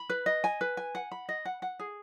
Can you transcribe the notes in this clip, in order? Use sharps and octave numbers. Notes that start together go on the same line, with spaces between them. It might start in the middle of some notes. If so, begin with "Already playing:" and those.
Already playing: B5
B4
D#5
G#5
B4
G#5
F#5
B5
D#5
F#5
F#5
G#4